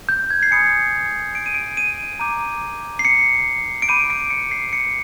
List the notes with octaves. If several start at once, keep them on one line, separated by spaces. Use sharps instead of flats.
G6
G#6
C7
G#5 B5 D#6 F#6 C#7
D7
D#7
D7
D#7
A#5 D6 G6 D#7
C7
C#7
D7
B5 D6 G6 D#7
D7
C#7
C7
C#7